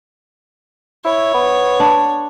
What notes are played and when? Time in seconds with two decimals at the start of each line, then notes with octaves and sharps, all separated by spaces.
1.05 E4 C#5
1.35 B3
1.80 D4